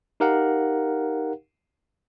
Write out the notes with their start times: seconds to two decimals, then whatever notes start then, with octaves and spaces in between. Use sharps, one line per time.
0.20 D#4 G4 A#4 F5 F#5